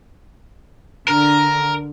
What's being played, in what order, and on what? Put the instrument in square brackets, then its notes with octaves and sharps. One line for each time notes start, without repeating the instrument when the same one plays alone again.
[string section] D3 [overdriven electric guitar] A#4